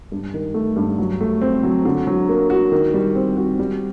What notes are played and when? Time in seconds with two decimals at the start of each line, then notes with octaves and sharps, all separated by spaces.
0.12 G2
0.34 D#3
0.54 A3
0.76 G2
0.99 F#3
1.21 A3
1.41 C4
1.63 F#3
1.85 D3
2.07 F#3
2.29 A#3
2.50 F#4
2.72 D#3
2.94 G3
3.15 C4
3.37 F#4
3.59 G3